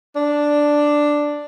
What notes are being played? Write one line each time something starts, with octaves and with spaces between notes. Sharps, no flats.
D4